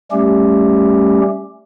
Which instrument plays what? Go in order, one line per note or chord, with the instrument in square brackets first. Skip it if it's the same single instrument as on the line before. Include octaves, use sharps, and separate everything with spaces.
[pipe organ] G3 A3 C#4 G4